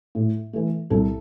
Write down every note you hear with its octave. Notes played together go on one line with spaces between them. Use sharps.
A2
E3 A3
C2 A4